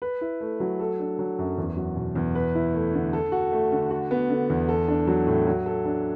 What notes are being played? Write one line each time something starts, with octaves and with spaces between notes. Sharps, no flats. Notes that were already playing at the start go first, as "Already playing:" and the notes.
B4
E4
A3
F#3
A4
D4
F#3
F#2
E2
F#3
B2
E2
B4
E4
A3
D3
A4
F#4
A3
D3
F#4
B3
D3
E2
A4
D4
F#3
A2
F#3
A4
D4